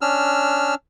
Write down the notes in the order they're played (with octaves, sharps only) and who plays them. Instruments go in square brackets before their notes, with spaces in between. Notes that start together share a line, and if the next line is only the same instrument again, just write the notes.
[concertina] C#4 D4 E6 F6